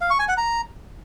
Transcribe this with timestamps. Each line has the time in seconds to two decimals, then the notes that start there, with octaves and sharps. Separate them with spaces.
0.01 F5
0.10 C#6
0.19 G#5
0.28 F#5
0.37 A#5